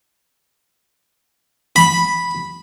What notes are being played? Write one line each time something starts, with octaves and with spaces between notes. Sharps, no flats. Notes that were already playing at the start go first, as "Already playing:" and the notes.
B5